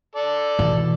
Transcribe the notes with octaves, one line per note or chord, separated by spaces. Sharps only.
A4 D5
B2 E3